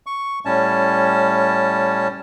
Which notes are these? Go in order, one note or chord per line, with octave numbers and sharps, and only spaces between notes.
C#6
A2 G3 C#4 A5